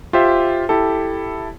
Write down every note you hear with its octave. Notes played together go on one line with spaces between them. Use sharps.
F4 G4 C5 E5
E4 G4 A4